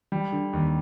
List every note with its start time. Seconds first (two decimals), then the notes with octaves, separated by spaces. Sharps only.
0.12 G3
0.33 D3
0.53 D#2